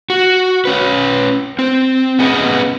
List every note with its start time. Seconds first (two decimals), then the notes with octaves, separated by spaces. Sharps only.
0.10 F#4
0.65 C#4 B4
1.59 C4
2.19 B3 C#4 G#4 B4 D#5 F#5